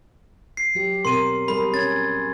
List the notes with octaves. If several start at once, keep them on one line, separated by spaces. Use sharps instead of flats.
C7
F#3 G4
B2 C4 A#4 C6 D#7
G3 G#4 A#4 B5
C#4 G#6 A6